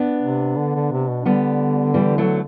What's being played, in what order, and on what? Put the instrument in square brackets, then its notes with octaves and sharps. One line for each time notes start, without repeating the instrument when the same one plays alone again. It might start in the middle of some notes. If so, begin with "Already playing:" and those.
Already playing: [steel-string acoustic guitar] B3 D4
[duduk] C3
D3
D3
C3
B2
[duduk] D3 [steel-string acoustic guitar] G3 B3
[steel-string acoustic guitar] E3 G3
F#3 A3